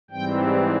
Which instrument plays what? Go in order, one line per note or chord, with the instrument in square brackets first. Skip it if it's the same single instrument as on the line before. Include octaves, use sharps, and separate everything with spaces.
[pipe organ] G#2 E3 G3 C4 G5